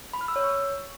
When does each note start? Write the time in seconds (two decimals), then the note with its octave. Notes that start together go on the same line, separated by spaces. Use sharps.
0.13 B5
0.21 F6
0.28 E6
0.36 C#5
0.43 C#6